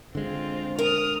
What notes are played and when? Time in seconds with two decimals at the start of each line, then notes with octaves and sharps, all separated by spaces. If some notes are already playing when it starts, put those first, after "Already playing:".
0.15 D3 G#3 C4 F4
0.79 A#4 D#6 F6